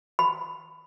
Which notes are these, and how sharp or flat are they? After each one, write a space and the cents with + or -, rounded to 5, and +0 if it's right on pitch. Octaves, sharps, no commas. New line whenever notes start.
B5 +15